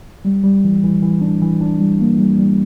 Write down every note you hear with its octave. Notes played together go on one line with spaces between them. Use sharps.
G3
G3
E3
E3
E3
D4
E3
D4
G3
A#3
G3
G3